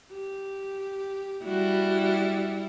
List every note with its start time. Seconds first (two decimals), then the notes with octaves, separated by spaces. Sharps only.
0.11 G4
1.45 G3 E4 F#4